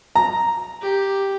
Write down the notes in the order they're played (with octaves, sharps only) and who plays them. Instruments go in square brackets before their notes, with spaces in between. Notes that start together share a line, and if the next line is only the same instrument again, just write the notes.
[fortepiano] A#5
[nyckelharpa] G4